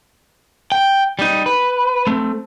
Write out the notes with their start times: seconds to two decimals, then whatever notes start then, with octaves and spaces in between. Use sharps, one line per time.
0.72 G5
1.19 G3 D#4
1.46 B4
2.07 A3 C4